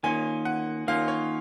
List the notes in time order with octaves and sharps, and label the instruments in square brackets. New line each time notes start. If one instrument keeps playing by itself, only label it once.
[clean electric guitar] D#3 A#3 C#4 F4 [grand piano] G#5
[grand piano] F#5
[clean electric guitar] D#3 A#3 C#4 F4 [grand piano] F5
[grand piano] C#5